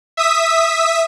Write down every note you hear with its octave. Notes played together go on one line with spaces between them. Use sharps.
E5 D#6 B6